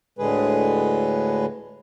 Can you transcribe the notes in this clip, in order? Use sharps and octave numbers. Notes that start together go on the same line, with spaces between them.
D2 A2 D3 G#3 G#4 B4